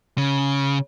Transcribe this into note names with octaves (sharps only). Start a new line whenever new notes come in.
C#3